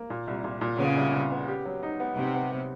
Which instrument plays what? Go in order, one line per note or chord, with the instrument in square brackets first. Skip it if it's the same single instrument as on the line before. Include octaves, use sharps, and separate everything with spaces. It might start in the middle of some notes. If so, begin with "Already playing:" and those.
Already playing: [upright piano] A#3
A#2
C2
A#2
A#2
[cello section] C#3 [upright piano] B3
[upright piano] C2
C2
B3
G4
F#3
D#4
B3
[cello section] C3 [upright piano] D#4
[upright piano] B3
B3